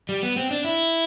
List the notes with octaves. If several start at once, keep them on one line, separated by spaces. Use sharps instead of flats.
G3
B3
C4
D4
E4